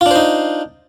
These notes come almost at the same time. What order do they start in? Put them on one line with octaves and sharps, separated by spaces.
F4 D4 C5 D#4